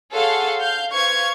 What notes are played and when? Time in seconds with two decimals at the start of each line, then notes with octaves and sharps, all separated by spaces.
0.12 G#4 A4 C#5 F5 F#5 C6
0.60 F5 G6
0.93 B4 C5 F5 C#6 G#6